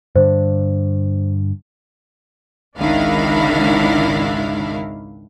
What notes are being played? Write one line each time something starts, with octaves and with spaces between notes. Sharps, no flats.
G2 D3 C5
G#1 C#2 D#3 D4 E4 F5